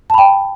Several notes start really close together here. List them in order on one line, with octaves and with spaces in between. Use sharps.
A5 B5 G5